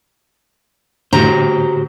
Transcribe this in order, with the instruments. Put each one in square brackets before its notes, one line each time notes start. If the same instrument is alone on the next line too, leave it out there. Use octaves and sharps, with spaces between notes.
[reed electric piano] A2 D3 [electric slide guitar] F#4 G4 C5 [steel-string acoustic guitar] A#5